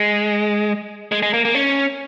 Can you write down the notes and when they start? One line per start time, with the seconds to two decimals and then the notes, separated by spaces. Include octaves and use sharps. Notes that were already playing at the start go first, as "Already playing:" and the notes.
Already playing: G#3
1.12 G#3
1.23 G#3
1.34 A#3
1.45 A#3
1.55 C#4